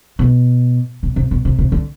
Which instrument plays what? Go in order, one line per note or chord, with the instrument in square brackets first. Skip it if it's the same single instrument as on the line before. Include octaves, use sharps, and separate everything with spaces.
[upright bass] B2
B2
C3
B2
C3
C3
D3